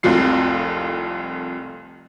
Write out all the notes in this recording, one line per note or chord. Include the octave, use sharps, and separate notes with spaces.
F1 C2 F2 F4 C7